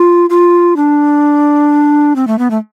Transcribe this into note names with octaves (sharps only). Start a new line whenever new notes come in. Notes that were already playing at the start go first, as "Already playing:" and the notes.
Already playing: F4
F4
D4
C4
A3
B3
A3